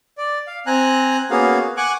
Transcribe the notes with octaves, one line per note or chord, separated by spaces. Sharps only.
D5
F5
C4 G#5 A#5 F#6
A#3 B3 C#4 F#4 G#4 F5
F#5 G#5 C#6 D6 F#6